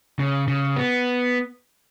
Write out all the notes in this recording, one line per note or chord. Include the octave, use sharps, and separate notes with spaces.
C#3
C#3
B3